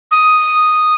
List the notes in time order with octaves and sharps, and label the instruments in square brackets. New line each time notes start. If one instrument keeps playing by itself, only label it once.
[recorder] D#6